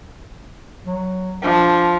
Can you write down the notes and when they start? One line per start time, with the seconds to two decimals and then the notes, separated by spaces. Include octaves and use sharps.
0.87 F#3
1.43 F3 D4